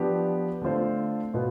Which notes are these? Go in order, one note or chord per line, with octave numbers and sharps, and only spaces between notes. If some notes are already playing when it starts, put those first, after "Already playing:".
Already playing: F3 B3 D4 G4
D3 A3 C4 F4 C5
B2 B3 F4